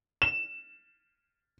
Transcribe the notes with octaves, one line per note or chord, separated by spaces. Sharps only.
E7